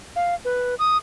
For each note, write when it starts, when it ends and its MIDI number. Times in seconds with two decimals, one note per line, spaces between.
0.16 0.35 77
0.45 0.75 71
0.79 0.97 87